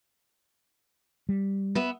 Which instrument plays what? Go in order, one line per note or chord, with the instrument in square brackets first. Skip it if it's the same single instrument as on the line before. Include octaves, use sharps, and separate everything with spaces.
[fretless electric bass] G3
[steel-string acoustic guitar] B3 E5